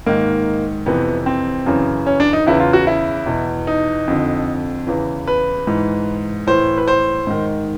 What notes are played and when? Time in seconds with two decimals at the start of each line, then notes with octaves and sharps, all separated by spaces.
0.06 G#2 D#3 A#3
0.86 F2 C3 E3 B3
1.26 C4
1.66 F#2 C#3 E3
2.06 C#4
2.20 D4
2.33 D#4
2.47 E2 C#3 E3 E4
2.60 F4
2.73 F#4
2.87 E4
3.26 E2 B2
3.67 D#4
4.08 F2 D3
4.87 E2 C#3 E3
5.28 B4
5.67 G#2 E3
6.47 A2 E3 C5
6.78 B4
6.88 C5
7.27 G#2 D#3